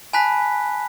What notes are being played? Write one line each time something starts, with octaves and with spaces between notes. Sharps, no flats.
G#5 A5 B5 F#6 B6